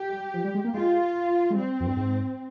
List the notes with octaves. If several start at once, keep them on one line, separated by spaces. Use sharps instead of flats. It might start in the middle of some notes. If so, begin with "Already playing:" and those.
Already playing: G4
G#3
G3
F3
G3
G#3
A#3
G#3 F4
G#3
G3 C4
F2
G2
G#2